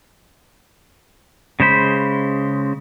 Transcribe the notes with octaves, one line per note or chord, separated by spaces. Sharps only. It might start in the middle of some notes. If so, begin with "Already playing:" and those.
C#3 G#3 C5 B5